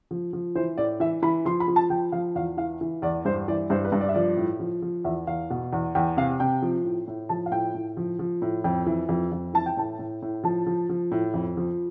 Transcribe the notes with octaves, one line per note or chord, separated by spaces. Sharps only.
F3
F3
E3 C5
A2 D5
E3 E5
E3 B5
F3 C6
B5
F3
A5
F3 G5
F3 F5
E2 F5
E3 F5
E3
E2 D5
G2 C5
E3 D5
G2 C5
B4
G2
D5
E5
F3 D5
A2
F3
F3
E2 E5
E2 F5
B2
E2
E2 G5
C3 F5
C3 G5
F3
A2
A2
F3 A5
F5
A2 G5
A2
F3
F3
A2
F2 G5
E3
F2
F2
E3 A5
G5
A2 A5
A2
A2
F3 A5
F3
F3
A2
F2
F3